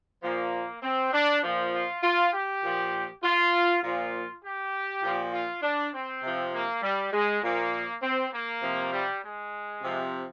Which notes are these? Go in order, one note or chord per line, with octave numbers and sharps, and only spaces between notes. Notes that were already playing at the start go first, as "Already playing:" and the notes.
A#2 F3 A#3
C4
D4
A#2 F3
F4
F4
G4
A#2 F3
F4
A#2 F3 F4
G4
A#2 F3
F4
D4
C4
C3 F3
A#3
G3
G#3
A#2 F3 A#3
C4
A#3
C3 F3
G3
G#3
C3 F3